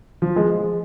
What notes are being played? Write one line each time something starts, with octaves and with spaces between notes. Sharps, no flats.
F3
G#3